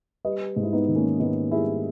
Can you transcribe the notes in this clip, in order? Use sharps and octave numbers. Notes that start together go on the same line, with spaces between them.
G3 B4 D#5
G#2
E4
B3 D#4
D#3
A#3 C#4
G#2 B3 D#4
G3 E4 G#4